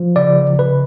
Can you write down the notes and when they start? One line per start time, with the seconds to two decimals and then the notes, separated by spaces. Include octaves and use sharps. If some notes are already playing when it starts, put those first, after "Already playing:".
Already playing: F3
0.16 C#3 D5
0.59 C#3 B4